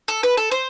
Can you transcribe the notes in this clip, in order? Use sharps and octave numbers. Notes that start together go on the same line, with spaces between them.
A4
B4
A4
C5